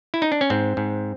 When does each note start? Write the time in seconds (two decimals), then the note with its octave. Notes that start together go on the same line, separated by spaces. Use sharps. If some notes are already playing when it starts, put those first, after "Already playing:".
0.14 E4
0.22 D#4
0.32 D4
0.41 C#4
0.50 G#2 C4
0.77 G#2